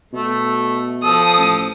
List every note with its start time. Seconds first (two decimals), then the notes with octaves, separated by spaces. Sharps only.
0.13 B2 A3
1.04 F3 A4 D#6
1.38 A1